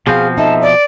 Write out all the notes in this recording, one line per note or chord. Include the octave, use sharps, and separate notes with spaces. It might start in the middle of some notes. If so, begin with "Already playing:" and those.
B2 F3 C4 G#4 F5
D#4 A4 E5 A5
D5